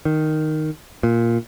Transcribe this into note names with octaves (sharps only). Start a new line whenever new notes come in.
D#3
A#2